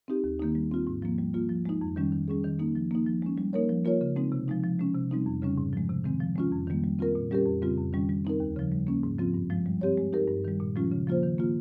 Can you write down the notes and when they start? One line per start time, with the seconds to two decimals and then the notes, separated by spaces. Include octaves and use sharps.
0.08 C4 D#4 G4
0.24 D#2
0.40 D#3 A#3 D#4
0.55 G3
0.71 C4 F4
0.87 G#2
1.02 F3 A#3
1.18 G3
1.34 A#3 F4
1.49 F3
1.65 G#3 D#4
1.81 F2
1.96 D#3 G3 C#4
2.12 D#3
2.28 G3 C#4 G#4
2.44 D#3
2.59 A#3 D#4
2.75 F3
2.91 A#3 D#4
3.07 F3
3.22 G#3 C#4
3.38 G3
3.53 A#3 D#4 A#4 C#5
3.70 F3
3.85 A#3 F4 A#4 C#5
4.01 C#3
4.16 G#3 C4 D#4
4.32 C3
4.48 F3 G#3 D#4
4.63 F3
4.79 G#3 C#4
4.95 C3
5.11 G3 C4 D#4
5.26 F2
5.42 C#3 G3 C#4
5.58 G#2
5.73 F3 G#3
5.89 C3
6.04 D#3 G#3 C4
6.21 F3
6.36 G#3 C#4 F4
6.52 F2
6.67 D#3 G3 A#3
6.84 G3
6.99 C4 F4 A#4
7.15 A#2
7.31 G3 C#4 G4 A#4
7.46 F2
7.62 C#3 G3 C4 F4
7.78 F2
7.93 D#3 G3 C#4
8.09 G3
8.25 C4 D#4 A#4
8.40 D#2
8.56 C#3 F3
8.72 G3
8.87 A#3 C#4
9.03 G#2
9.19 F3 C4 F4
9.34 G2
9.50 F3 G#3
9.66 G3
9.81 C4 G4 C#5
9.97 G#3
10.13 D#4 G4 A#4
10.28 G2
10.45 D#3 G3
10.60 A#2
10.76 F3 G#3 C#4 F4
10.92 C#3
11.07 F3 A#3 F4 C5
11.23 D#3
11.38 A#3 F4